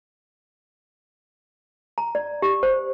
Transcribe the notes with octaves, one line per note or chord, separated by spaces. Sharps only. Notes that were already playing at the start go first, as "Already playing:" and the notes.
A#5
D5
G4
C5